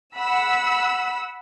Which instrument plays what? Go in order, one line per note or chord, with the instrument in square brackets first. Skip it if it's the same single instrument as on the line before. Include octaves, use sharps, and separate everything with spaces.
[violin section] F#5 B5 E6